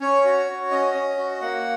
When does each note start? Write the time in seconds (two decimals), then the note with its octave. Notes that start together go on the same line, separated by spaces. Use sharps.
0.01 C#4 C#5
0.25 F#4
0.48 F#4
0.71 C#4 D#5
0.94 C#4
1.17 F#4
1.42 A#3 F#5